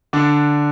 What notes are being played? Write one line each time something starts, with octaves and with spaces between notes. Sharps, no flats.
D3 D4